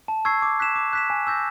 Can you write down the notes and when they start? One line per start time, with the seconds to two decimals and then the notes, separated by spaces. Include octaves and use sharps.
0.08 A5
0.25 C#6 E6 G#6 C7
0.42 D6
0.60 F#6 B6 E7
0.76 D6
0.93 F#6 B6 E7
1.10 G#5
1.27 C#6 E6 G6 A#6